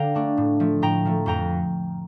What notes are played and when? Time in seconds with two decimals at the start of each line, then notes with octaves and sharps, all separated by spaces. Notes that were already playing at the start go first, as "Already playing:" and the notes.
Already playing: D3 F5 G5 A#5
0.15 A3 D4
0.37 A2
0.60 F3 A3
0.82 A2 G5 A#5
1.05 F3 A3
1.26 F2 G5 A#5